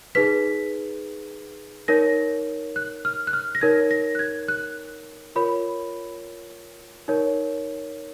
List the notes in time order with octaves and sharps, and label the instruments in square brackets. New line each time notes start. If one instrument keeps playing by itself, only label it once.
[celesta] D#4 G#4 B4 B6
D#4 A#4 C#5 A#6
F#6
F6
F#6
F6
A#6
D#4 A#4 C#5 G#6
A#6
F#6
G#6
F#6
F4 A#4 C#5 B5
D#4 A#4 C#5